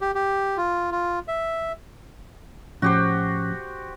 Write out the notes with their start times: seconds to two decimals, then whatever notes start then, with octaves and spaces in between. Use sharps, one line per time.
0.01 G4
0.15 G4
0.57 F4
0.91 F4
1.28 E5
2.82 A2 F3 C#4 F#4 G4 C5